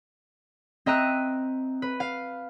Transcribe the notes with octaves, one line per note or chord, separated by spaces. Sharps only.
C4 D#5 E5 A#5 F#6 D#7
B4
F5